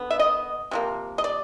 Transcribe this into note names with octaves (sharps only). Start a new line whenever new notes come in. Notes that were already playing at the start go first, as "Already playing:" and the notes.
Already playing: D3 B3
E5
D#5
C3 F3 A#3
D#5
D5